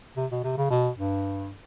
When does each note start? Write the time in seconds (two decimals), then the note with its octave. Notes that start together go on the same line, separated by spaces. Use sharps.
0.17 C3
0.31 B2
0.44 C3
0.57 C#3
0.70 B2
0.97 G2